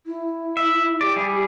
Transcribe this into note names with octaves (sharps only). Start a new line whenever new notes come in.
E4
E5
G4 D5
G3 E4 G#4